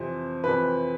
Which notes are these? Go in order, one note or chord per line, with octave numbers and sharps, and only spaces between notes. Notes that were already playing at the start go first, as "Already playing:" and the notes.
Already playing: F2 C3 E3 C5
F2 C3 E3 B4